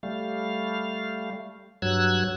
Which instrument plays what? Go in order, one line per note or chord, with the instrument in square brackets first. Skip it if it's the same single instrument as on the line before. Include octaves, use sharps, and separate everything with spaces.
[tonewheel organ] G3 A3 F5
G2 F#3 E6 F#6 G#6